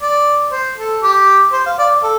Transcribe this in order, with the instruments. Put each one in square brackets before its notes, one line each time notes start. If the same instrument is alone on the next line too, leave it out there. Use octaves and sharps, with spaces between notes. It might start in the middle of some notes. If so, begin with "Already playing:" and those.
[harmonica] D5
C5
A4
G4
C5
F5
D5
A4